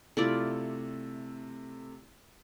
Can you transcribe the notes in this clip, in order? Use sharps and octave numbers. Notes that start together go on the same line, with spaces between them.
C3 A3 E4 F4 A4 D5